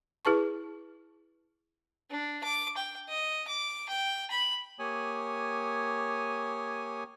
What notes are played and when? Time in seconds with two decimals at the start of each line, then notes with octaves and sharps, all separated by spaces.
0.25 E4 G#4 B4 A5 C#6
2.11 D4
2.44 D6
2.77 G5
3.09 D#5
3.48 D6
3.89 G5
4.31 B5
4.79 A#3 G4 C#5 G#5 D#6